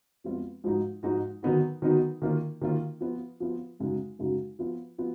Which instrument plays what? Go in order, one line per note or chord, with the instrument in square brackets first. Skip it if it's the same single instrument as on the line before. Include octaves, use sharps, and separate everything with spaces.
[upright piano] F2 F3 G#3 B3 F4
G#2 F3 G#3 D#4 F#4
G#2 F3 G#3 D#4 F#4
D#3 F#3 B3 D#4 F#4
D#3 F#3 B3 D#4 F#4
D#3 A#3 F4
D#3 A#3 F4
F3 B3 F4
F3 B3 F4
F#2 C#3 G#3 D#4 F#4
F#2 C#3 G#3 D#4 F#4
F3 B3 F4
F3 B3 F4